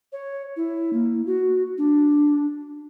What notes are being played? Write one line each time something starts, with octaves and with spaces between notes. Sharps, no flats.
C#5
E4
A#3
F#4
D4